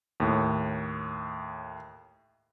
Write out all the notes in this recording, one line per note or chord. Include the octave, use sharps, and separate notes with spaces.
D#2 A2